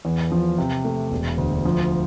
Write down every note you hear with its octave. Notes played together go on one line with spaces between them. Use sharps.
E2
F3
C3
A3
E1
D2
F3